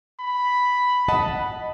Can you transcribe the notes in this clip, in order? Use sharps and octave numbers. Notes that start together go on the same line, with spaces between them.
B5
D#5 F#5 A5